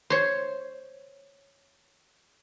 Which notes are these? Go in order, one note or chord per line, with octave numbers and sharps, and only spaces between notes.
C5 C#5